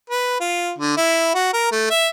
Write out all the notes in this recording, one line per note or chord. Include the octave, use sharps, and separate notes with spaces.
B4
F4
D3
E4
F#4
A#4
A3
E5